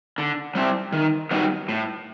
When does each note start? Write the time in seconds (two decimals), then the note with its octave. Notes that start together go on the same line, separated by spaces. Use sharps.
0.18 D3
0.55 G3 C4 E4
0.93 D#3
1.31 G3 B3 D#4 F#4
1.69 A2